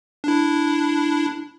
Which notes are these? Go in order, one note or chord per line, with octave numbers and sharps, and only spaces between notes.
D4 E4